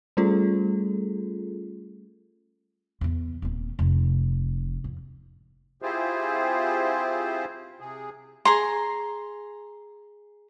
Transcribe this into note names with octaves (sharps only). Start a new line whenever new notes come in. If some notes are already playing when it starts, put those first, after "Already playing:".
G3 A3 C#4 F4 G#4 A4
E2 E3
D#1 C4
F1
F2
C4 E4 F4 G4 G#4 C5
C3 G#4
G#4 A#5 C6